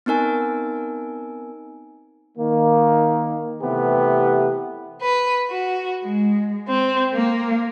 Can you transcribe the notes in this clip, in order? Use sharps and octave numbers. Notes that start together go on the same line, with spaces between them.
B3 C4 D#4 A#4 G#5
D#3 A#3
C3 E3 A3 B3 G4
B4
F#4
G#3
C4
A#3